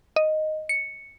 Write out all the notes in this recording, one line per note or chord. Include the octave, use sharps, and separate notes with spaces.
D#5
C#7